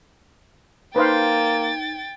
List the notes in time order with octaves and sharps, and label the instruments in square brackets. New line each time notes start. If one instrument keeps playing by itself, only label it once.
[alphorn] A#3 [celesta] D#4 [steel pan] B4 C5 F5 [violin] G5 A6